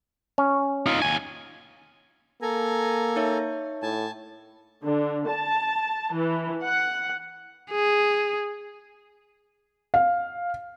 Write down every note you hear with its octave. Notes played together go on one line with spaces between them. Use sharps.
C#4
D#4 F4
D#2 G#5
A#3 A4 G#5 A#5
D#4 C#5 E5
A2 G#5 A5
D3
A5
E3
F#5
G#4
F5